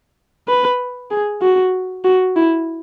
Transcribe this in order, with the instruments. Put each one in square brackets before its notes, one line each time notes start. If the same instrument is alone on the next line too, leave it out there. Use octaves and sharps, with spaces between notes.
[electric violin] B4
G#4
F#4
F#4
E4